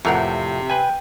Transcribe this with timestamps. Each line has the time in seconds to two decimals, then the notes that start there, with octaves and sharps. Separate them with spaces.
0.05 F2 A2 C3 E3 A#4 F#5
0.70 B4 G5 G#5